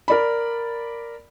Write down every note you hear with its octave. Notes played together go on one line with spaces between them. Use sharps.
A#4 D5 B5